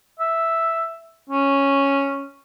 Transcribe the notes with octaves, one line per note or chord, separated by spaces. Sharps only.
E5
C#4